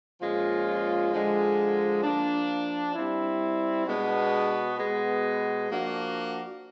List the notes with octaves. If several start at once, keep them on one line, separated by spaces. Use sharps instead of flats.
A#2 F3 G#3 C#4 F4
D3 F3 G#3
F3 A#3 D4
G3 C4 E4
B2 G#3 B3 D4 F#4
B2 G#3 B3
F3 A#3 D4 F#4